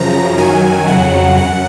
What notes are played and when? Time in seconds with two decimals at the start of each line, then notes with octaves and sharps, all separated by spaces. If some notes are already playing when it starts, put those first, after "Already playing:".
Already playing: F#2 C#3 F3 A#5
0.38 F#2 D#3 F#3 G#5
0.87 F2 C#3 F#3 F#5
1.38 F#2 F#5